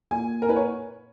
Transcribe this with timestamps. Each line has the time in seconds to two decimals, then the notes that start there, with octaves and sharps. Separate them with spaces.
0.11 A#2 G#5
0.42 A#4
0.49 B4
0.56 C#5